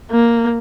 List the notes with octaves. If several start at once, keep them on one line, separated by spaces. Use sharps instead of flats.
A#3